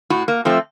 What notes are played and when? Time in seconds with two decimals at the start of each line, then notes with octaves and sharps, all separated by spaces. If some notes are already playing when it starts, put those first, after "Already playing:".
0.10 A2 F#4
0.28 A#3
0.45 F3 A3 C4